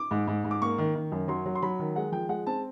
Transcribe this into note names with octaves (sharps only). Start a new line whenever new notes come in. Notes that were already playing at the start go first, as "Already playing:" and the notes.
Already playing: D6
G#2
G#2
G#2
D6
A#3 C#6
D#3
D#3
F#2
F#3 C6
F#3
C6
F#3 B5
D#3
G#3 F#5
F3 G5
G#3 F#5
C4 A5